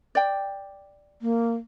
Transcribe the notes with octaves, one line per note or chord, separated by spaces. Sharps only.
D5 G5
A#3